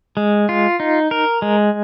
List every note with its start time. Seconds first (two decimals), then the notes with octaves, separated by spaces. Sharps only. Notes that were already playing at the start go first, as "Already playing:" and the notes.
0.17 G#3
0.49 F4
0.80 D#4
1.11 A#4
1.42 G#3